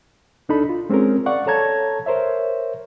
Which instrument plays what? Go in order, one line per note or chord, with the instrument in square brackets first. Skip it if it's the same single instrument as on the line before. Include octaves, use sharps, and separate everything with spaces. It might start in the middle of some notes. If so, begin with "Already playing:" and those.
[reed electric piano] C#2 D4 D#4 A4 B5
F4
G#3 C4 C#4 G#4 A#4
D5 F5 F#5 C#6
A4 C#5 A5 A#5 G#6
A#4 C5 C#5 E5